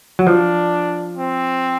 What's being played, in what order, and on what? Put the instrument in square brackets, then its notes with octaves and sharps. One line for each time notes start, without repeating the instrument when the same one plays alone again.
[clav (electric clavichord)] F#3
[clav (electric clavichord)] F3 [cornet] D4
[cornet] C4